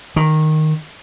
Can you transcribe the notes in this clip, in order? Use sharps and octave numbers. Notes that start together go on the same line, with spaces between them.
D#3